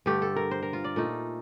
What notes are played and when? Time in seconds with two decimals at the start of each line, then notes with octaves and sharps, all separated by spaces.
0.06 G2 D3 A3 G4
0.22 A4
0.36 A#4
0.51 C5
0.63 A#4
0.73 F4
0.84 D5
0.96 A#2 A3 D#4